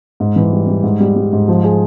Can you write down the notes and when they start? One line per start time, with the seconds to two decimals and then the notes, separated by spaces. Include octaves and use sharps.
0.20 G#2
0.36 E3
0.52 G3
0.67 G3
0.83 G#2
1.00 G3
1.16 G3
1.33 G#2
1.48 F3
1.64 G#4